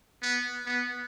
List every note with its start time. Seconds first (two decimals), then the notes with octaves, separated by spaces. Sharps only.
0.22 B3
0.66 B3